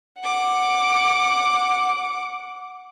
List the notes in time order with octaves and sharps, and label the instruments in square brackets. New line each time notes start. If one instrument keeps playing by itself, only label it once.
[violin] F#5 D6